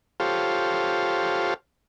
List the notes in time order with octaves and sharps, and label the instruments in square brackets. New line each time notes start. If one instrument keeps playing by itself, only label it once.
[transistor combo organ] F4 G4 A4 C5 C#5 F5